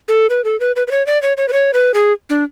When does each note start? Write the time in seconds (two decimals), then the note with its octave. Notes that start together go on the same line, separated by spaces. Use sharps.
0.08 A4
0.30 B4
0.44 A4
0.60 B4
0.76 B4
0.87 B4
0.91 C#5
1.07 D5
1.22 C#5
1.37 C#5
1.48 B4
1.53 C#5
1.74 B4
1.94 G#4
2.30 D4